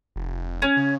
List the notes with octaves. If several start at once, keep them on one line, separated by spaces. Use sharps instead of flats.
F1
C#4
C#3